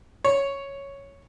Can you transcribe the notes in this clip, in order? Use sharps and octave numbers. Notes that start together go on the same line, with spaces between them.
C#5